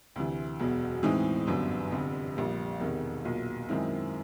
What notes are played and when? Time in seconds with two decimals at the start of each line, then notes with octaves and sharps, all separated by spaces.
0.16 D2 C3 E3
0.60 E1 E2 B2 F#3
1.03 A2 E3 G#3 C4 D#4
1.47 G1 F#2 D3 F#3 B3
1.91 F1 F2 D3
2.36 A#1 A#2 G3
2.80 E1 E2 C3 D#3
3.24 B1 A#2 F#3
3.69 F#2 D#3 G#3 C4 E4